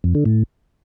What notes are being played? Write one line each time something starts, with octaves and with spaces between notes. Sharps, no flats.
F2
D3
A2